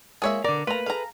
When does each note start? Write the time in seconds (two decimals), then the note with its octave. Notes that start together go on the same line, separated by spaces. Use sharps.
0.22 G#3 A#3 F4 G#4 C#5 E5
0.44 B2 D3 A#4 D5
0.67 A3 A#3 F4 B4 F5 A#5
0.86 G#4 A4 F5 A#5